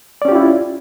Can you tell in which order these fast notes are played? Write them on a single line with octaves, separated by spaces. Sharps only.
D5 C#4 G4 F4 E4